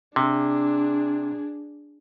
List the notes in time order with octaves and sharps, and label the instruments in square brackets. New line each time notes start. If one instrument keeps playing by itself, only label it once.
[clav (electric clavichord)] C3 [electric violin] D4 G#4